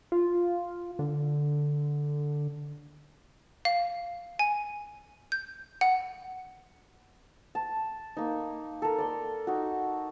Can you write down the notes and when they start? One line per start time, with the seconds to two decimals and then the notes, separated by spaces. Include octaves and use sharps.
0.12 F4
0.99 D3
3.65 F5
4.39 G#5
5.32 G6
5.81 F#5
7.55 A5
8.17 A#3 D#4
8.82 A4 A#4
8.98 D5 C6
9.47 D#4 F#4